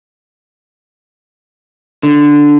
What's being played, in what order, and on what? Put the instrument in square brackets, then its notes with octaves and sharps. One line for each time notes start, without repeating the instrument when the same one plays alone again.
[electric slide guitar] D3